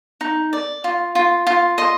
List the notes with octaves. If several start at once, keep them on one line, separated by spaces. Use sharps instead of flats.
D#4
D5
F4
F4
F4
D#5 C6